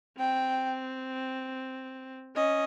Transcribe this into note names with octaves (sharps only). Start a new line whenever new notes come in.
C4 G5
C#4 D#5